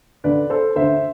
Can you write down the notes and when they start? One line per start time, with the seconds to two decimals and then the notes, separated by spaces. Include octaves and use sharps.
0.24 D2 D3 B4 D5
0.50 A4 C5
0.76 D2 D3 C5 E5